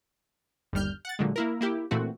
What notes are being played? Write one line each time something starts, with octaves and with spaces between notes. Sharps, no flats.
G1 D#2 G3 F6 G6
F#5 A6
A#2 D3 F#3 G#3
A#3 E4 A#4
A#3 E4 G4
A#2 E3 A3 C4 F#4